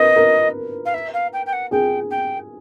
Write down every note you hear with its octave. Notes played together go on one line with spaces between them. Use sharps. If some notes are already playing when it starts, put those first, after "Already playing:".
Already playing: A#4 B4 D#5
A#4
F5
E5
F5
G5
G5
F#5
G#4 G5
G5